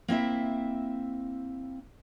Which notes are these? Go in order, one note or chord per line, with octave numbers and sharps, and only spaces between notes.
A#3 C4 E4 E5